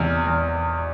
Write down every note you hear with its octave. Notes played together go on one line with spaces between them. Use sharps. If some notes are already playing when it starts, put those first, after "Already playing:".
Already playing: E2 C3 F6
E2